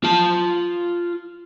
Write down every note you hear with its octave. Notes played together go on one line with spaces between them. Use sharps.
F4 A5